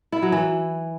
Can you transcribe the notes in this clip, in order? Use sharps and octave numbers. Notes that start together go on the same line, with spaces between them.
E4
F#3
E3